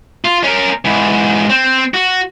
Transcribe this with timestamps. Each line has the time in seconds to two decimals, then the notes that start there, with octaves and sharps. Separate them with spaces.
0.25 F4
0.44 C#4 A#4
0.85 G#2 E3
1.50 C4
1.94 F#4